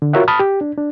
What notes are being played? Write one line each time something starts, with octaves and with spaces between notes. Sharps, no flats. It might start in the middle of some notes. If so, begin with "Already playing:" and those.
D3
F4 F#4 A#4 C#5 E5 F#5
A5 B5 D#6 F6
G4
D4
D4